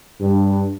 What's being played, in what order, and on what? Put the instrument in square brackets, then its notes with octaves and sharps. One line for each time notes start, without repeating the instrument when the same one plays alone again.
[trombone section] G2